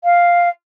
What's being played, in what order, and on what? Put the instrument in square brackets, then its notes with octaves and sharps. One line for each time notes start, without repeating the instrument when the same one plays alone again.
[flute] F5